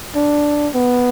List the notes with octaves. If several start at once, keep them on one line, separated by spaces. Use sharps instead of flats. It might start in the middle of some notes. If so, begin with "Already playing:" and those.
D4
B3